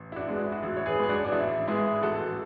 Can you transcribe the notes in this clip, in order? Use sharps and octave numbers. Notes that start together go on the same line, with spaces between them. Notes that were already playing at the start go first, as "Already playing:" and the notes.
Already playing: A1
E4
D4 F#4
G#2 G#3 B3
E4
F#4
A1 E4
C#5
G#4 B4
G#2 G#3 B3 G#4
D4 F#4
D4
A1 E4
G#2 G#3 B3 E4 G#4
A1 F#4 A4